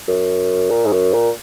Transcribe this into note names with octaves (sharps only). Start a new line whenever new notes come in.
F#2
A#2
G#2
F#2
A#2